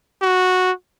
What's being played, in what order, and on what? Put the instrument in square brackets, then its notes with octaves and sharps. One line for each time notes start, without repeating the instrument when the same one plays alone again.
[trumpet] F#4